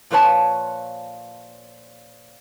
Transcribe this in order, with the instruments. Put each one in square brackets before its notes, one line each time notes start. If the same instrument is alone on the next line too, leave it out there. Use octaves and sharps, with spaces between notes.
[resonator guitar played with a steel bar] A#2 F3 B4 C#5 A5